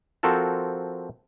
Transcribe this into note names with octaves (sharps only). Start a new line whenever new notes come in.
F3 C4 F#4 A4 A#4 A5